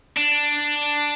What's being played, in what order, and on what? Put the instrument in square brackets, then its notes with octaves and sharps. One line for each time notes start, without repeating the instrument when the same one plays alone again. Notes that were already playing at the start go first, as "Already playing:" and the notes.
[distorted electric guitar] D4